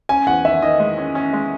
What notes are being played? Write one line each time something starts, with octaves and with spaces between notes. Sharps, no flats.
C#4 G#5
E2 F#5
D#3 E5
D#3 D#5
G#3
C#4
C#4
G#3